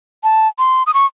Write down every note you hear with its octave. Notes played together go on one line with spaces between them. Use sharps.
A5
C6
D#6
C#6